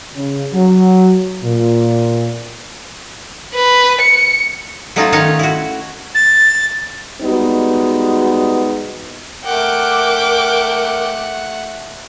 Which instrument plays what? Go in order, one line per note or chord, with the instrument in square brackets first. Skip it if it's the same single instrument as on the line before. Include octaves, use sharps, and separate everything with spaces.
[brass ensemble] C#3
F#3
A#2
[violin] B4
C#7
[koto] F#3 A3 C#4 D#4 F4
D#3 A3 C#4 D#4 C#5 F5
E4 F#4
[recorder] A6
[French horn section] G3 G#3 B3 D#4 F#4
[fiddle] A3 F#5 [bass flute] A#4 [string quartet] G5 D6